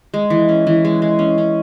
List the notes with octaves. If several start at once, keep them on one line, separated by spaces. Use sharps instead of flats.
G#3
E3
C#4
E3
G#3
G#3
C#4
C#4